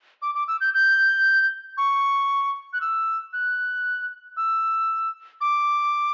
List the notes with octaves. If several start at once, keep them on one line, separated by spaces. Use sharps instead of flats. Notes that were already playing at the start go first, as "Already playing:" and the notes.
D6
D6
E6
G6
G6
C#6
F#6
E6
F#6
E6
D6